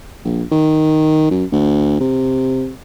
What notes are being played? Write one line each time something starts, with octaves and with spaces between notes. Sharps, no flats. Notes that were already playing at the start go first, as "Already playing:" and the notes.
A#1
D#3
F#2
D2
C3